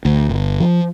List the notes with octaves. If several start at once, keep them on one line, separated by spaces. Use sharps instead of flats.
D2
G1
F3